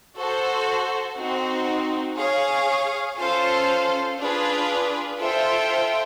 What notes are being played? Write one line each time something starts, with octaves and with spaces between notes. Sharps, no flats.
F#4 A4 C5
C4 D#4 F#4
G#4 C#5 F5
C#4 F4 A4 C5 F5
D4 F4 G#4 B4
F4 A4 C5 E5 G5